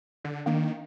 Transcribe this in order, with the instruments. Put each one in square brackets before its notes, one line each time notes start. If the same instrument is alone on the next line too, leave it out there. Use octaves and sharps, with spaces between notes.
[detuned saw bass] D3
[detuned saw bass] D#3 [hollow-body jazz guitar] A#3 D4 F5